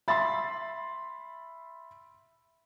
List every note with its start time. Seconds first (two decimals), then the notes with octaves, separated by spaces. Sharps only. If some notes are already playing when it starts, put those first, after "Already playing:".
0.08 E5 B5 C6 A6